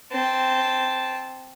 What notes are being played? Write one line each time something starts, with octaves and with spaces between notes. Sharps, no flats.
C4 A5